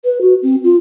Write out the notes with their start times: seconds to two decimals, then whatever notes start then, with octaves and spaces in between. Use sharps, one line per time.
0.04 B4
0.21 F#4
0.42 C4
0.64 F4